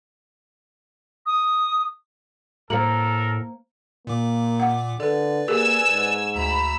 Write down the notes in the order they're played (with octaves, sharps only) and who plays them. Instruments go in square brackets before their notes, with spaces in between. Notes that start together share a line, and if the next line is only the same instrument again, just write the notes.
[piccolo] D#6
[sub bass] A2 [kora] A#3 [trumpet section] A4 A#4 [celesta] C5 C#7 F#7
[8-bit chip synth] A#2 D6 [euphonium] A#3
[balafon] F#5
[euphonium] D3 [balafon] A4 [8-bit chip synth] B4 D5
[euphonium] A#3 [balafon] G4 G#4 A#4 [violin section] G#5 E6
[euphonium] G#2
[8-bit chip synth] D2 A#5 [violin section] B5 E6